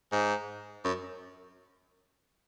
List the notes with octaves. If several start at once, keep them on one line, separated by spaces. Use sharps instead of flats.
G#2
F#2